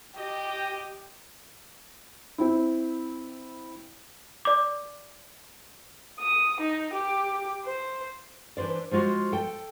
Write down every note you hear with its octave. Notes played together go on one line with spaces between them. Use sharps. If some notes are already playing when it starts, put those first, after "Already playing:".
G4 D#5 G5
C4 E4
D5 D6
D#6
D#4
G4
C5
E3 D4 B4 C5 D5
F3 G#3 F4 F#4
A4 G5